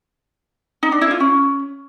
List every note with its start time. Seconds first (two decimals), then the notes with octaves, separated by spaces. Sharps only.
0.83 D#4
0.92 D4
1.01 E4
1.11 F4
1.20 C#4